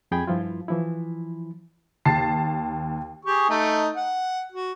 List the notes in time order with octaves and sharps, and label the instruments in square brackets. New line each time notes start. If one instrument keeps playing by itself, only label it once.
[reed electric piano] F2 G#4 G5 B5 G#6
G2 F3 E4 F4
E3 F3 E4
[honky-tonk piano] D#2 A5 A6 C7
[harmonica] G4 G#4 C#6
A3 D#4 D#5
F#5
F#4